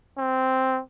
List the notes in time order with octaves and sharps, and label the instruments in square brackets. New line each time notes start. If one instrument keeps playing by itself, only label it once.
[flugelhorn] C4